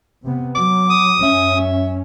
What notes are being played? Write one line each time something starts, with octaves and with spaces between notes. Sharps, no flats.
C3 B3
F#3 D6
D#6
F#2 C#4 E5